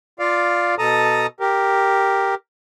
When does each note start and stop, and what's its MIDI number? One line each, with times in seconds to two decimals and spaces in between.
0.19 0.75 65
0.19 0.75 74
0.19 0.75 77
0.79 1.27 47
0.79 1.27 69
0.79 1.27 81
0.79 1.27 82
0.79 1.27 87
1.40 2.35 67
1.40 2.35 70